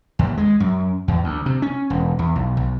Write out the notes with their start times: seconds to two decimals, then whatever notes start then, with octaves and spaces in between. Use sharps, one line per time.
0.19 D#2
0.37 G#3
0.60 F#2
1.08 E2
1.24 D2
1.46 C3
1.62 C#4
1.90 E1
2.19 E2
2.35 B1
2.57 B1